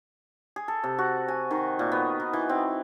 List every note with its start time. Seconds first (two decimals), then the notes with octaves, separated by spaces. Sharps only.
0.56 G#4
0.68 A4
0.84 C3
0.99 F#4
1.28 G#5
1.51 D#3
1.79 A#2
1.92 B3
2.20 D#3
2.33 E3
2.49 C4